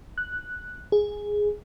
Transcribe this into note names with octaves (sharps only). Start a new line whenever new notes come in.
F#6
G#4